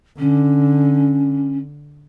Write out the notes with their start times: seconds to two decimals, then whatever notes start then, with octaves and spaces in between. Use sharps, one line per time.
0.19 D3 C#4